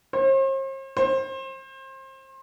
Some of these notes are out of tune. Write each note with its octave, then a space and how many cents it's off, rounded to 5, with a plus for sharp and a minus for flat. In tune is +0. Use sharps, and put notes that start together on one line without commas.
C5 +45
C5 +30